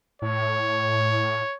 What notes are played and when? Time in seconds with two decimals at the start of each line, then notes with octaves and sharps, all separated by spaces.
0.22 A2 C#5